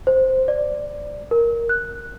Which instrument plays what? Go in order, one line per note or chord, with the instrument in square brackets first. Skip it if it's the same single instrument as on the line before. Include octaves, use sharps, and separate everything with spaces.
[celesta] C5
D5
A#4
F#6